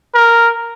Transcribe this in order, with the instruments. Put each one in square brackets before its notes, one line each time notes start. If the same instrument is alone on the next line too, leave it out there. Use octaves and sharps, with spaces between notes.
[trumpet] A#4